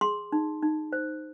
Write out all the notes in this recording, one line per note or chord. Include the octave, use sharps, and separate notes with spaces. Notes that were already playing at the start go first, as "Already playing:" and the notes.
G#4 C6
D#4
D#4
C5